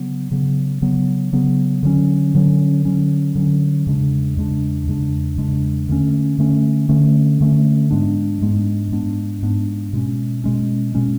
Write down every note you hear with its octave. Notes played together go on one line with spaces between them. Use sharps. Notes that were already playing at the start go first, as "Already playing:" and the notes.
Already playing: C#3 F#3 B3
C#3 F#3 B3
C#3 F#3 B3
C#3 F#3 B3
D3 F#3 C#4
D3 F#3 C#4
D3 F#3 C#4
D3 F#3 C#4
E2 C#3 G#3 D4
E2 C#3 G#3 D4
E2 C#3 G#3 D4
E2 C#3 G#3 D4
D3 A3 C#4
D3 A3 C#4
D3 A3 C#4
D3 A3 C#4
G#2 G#3 B3 D4
G#2 G#3 B3 D4
G#2 G#3 B3 D4
G#2 G#3 B3 D4
B2 G#3 C#4
B2 G#3 C#4
B2 G#3 C#4